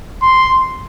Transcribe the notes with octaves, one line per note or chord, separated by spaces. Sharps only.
C6